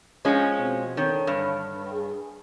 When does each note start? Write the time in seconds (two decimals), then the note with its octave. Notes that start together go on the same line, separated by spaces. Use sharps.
0.25 F3 G#3 C#4
0.58 B2 C4
0.97 D3 D#3 A4 C#5
1.27 G2
1.92 G#4